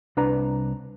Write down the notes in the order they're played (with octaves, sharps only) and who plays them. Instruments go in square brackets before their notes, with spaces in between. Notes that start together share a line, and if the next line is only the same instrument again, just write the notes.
[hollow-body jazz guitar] C2 D4 B4 A#5